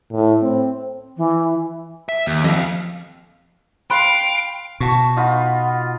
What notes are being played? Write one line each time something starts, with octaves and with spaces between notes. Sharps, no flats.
A2
C4
E3
E5
D#2
F2 D#5 F5
F5 G5 B5 C6 F#6
B2 F#4 A5 C#6
D#4 F4 B4 F#5